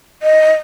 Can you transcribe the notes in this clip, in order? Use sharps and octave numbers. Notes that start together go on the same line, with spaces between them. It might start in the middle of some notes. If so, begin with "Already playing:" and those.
D#5